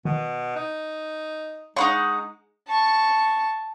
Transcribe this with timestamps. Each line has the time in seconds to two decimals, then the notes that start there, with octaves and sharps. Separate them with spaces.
0.05 B2 D#3
0.56 D#4
1.77 G#3 D#4 C#5 F5 F#5 B5 C#6
2.68 A5 C#6